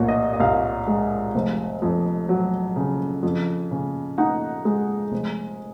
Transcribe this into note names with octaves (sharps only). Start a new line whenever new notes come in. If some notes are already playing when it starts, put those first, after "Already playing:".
Already playing: C2 A#2 C#5
D#5
D#5
C2 F5
G#3
F1
F2
F#3
C#3
F2
C#3
D#4 F#5
G#3
F1